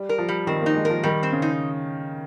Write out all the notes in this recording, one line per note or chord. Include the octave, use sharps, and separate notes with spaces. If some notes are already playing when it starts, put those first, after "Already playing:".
Already playing: G3
A#4
F3
G3
D#3 C4
A#3 D#4
G#3
F3 A#4
D#3 G3
C4
C#3
D#4